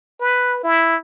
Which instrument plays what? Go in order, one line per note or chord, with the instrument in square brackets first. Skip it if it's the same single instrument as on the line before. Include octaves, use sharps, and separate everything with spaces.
[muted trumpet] B4
E4